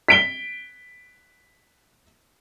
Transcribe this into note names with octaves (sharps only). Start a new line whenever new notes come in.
B6 D7 G7